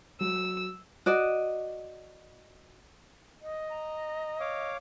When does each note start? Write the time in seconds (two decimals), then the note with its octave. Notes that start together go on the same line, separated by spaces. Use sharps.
0.20 F#3 E6
1.06 F#4 D5 D#5
3.42 D#5
3.71 A#5
4.40 C#5 F5 D6